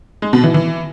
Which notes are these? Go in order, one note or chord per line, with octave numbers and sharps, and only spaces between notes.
G#3
B2
E3
E3